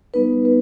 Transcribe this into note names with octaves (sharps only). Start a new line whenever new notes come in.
G3 B3 D#4 B4
B4